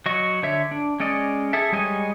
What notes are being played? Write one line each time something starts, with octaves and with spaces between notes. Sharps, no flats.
F#3 F#4 D#5 C#6
D3 C#5 E5
D4
G#3 C#4 D5 D#5
G#4 A4 E5
G3 G#3 C#5 D#5 G#5